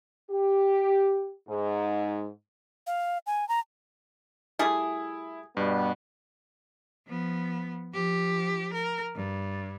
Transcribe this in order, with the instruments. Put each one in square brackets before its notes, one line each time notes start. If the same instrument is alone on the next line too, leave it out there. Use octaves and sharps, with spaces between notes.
[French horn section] G4
G#2
[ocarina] F5
G#5
A#5
[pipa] G3 A3 G#4 [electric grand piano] E4
[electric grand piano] G2 [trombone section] B2 G3 B3
[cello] F3 B3
F3 G4
A#4
G2